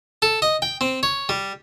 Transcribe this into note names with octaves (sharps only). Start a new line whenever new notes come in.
A4
D#5
G5
C4
C#5
G3